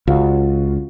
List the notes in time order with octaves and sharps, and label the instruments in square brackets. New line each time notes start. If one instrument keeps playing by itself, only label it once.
[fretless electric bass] C#2 [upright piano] F4 F#4